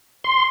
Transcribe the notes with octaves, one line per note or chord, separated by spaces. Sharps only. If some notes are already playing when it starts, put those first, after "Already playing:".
C6